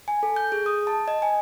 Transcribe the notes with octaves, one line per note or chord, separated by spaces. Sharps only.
G#5
A4
G6
G#4
D#6
A5
D#5
G#5